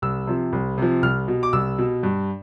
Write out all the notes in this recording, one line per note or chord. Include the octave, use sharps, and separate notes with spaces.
C2 E6
C3 F3
C2
C3 F3
C2 F6
B2
D6
C2 E6
B2
G2